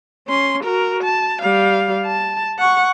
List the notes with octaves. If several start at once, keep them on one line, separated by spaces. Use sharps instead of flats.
C#4 C6
F#4 A#4
A5
G3 F5
A5
F#5 C#6